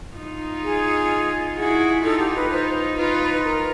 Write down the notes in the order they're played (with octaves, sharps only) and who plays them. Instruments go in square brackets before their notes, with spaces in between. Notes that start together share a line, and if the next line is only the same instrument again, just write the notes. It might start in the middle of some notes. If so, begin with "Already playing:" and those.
[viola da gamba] D#4 F4
[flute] G#4
[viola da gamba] E4 F#4 [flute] G#4
[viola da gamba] D#4 F4 [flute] A4
[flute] G4
B4
[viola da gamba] D#4 F4 [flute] C5
[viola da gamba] D#4 F4 [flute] B4
[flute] B4
A#4